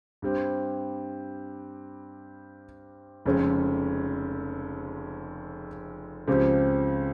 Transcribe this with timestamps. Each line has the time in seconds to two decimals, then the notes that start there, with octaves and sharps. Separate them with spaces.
0.22 G2 G3 C4
3.25 F1 F2 C#3 G#3 C#4
6.28 C#2 C#3 F3 C4 G4